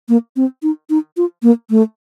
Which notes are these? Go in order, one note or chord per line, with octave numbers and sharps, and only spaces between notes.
A#3
C4
D#4
D#4
F4
A#3
A3